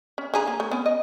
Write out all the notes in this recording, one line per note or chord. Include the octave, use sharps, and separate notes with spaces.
C#4
D3 G#4 A#5
A#3
A3
B3 C#4
D#5